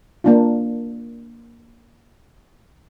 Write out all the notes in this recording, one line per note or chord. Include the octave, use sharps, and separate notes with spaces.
A#3 D4 F4